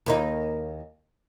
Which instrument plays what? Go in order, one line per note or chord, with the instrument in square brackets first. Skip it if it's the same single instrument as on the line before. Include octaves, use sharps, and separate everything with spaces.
[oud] D#2 A#3 D#4